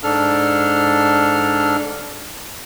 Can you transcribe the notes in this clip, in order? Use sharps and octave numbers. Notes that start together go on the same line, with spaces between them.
G#2 D4 A4 F6